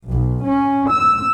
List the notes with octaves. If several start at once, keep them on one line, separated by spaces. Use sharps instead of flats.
B1
C#4
E6